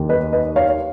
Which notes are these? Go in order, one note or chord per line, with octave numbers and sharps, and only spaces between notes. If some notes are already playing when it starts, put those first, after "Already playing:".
Already playing: D#2 D#3
B4 D#5
B4 D#5
C#5 F5